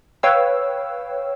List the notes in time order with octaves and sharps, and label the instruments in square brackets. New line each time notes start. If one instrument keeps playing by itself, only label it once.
[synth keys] B4 C#5 F5 G5 E6